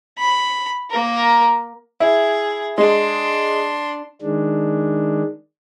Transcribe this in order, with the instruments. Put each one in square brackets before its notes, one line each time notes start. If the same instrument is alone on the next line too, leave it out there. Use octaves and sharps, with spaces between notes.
[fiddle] B5
A#3 A#4
[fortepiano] E4 [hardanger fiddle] G#4
[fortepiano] G#3 [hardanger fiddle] D4 C6
[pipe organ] D#3 G#3 D4